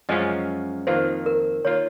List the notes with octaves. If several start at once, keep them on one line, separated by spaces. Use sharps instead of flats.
F#2 F3 G#3 C#4 F4 D#5
F2 D#3 A#3 F4 C5
A#4
D#3 A#3 F4 C#5